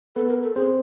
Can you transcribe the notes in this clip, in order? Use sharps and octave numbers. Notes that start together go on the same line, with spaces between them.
B3 A4 B4
A#4
A4
C4 G#4 C5